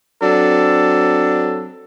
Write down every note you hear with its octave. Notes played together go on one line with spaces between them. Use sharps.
F#3 C4 D4 A4